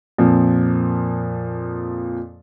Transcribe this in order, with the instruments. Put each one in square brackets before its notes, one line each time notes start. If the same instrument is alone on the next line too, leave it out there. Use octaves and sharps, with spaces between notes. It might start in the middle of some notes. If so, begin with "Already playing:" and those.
[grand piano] F2 A#2 F3